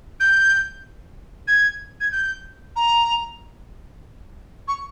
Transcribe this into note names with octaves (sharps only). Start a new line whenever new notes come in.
G6
G#6
G#6
G6
A#5
C#6